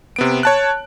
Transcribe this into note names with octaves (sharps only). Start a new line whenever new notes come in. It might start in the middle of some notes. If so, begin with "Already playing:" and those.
C3 B3 D7
C#5 A5 F#6